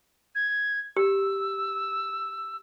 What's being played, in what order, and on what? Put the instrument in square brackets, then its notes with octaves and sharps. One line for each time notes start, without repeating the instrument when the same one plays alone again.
[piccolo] G#6
[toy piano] G4 [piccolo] E6